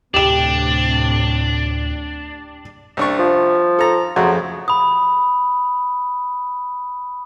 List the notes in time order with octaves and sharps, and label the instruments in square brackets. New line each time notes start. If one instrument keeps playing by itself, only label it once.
[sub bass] D2 [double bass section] A2 C3 [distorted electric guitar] D4 [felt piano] G4 E7
[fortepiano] C2 D4 C#6
[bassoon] F3
[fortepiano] A4 A#5
[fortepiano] F2 C#3 A3 [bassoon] F#3
[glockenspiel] B5 D#6